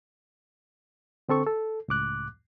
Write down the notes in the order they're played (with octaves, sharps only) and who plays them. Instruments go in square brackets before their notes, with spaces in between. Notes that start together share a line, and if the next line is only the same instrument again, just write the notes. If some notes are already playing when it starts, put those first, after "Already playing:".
[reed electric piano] D3 C4 A4 C#6
A4
C#2 A2 D6 F#6